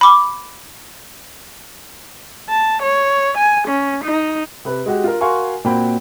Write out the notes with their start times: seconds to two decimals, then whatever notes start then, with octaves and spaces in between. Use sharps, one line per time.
0.01 B5 D6
2.50 A5
2.83 C#5
3.38 G#5
3.68 C#4
4.05 D#4
4.65 C3 B4
4.86 G#3 F#4 G4
5.04 F4 A#4
5.21 F#4 A#4 F5 G#5 C6 C#6
5.64 A#2 A#3 C4 F#4 G5 B5